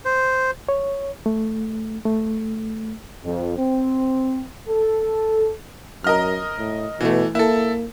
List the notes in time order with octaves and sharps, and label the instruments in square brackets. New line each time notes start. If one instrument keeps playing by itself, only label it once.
[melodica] C5
[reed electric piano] C#5
A3
A3
[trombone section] F2
C4
A4
[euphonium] F#2 [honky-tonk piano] A#4 D#5 F6
[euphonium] A2
[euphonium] B2 [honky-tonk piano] E3 A3
[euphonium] A#3 [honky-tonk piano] E4 A4